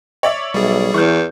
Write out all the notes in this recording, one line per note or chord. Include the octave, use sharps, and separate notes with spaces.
C#5 D5 E5
B1 G3 G#4
E2 E3 C#6 F6 G6